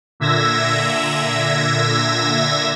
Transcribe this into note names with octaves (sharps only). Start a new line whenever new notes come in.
A#2 D3 E5 E6 G#6 A#6